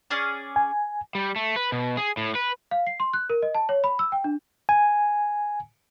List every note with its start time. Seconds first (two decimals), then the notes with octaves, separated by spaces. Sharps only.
0.10 C#4 G#4 D5
0.56 G#5
1.15 G3
1.36 A3
1.56 B4
1.72 B2
1.97 G#4
2.17 A2
2.35 B4
2.71 F5
2.87 C7
3.00 C6
3.13 F#6
3.30 A#4
3.42 D#5
3.55 A5
3.69 C#5
3.84 B5
3.99 E6
4.12 G5
4.24 D4
4.69 G#5